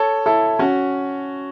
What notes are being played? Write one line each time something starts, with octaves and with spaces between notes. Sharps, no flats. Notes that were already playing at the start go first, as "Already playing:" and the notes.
Already playing: A4 C#5
E4 A4
C#4 F#4